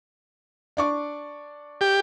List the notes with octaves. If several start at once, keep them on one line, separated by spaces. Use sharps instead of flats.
D4 D5 C#6
G4